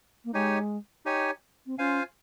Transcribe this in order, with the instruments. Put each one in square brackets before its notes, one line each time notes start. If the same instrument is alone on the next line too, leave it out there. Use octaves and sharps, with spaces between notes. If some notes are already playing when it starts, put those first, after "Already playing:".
[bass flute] A#3
[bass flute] G#3 [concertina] D#4 G4 C#5 G#5
[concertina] D#4 G4 C#5 G#5
[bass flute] C4
[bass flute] C#4 [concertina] F4 C5 F5 G#5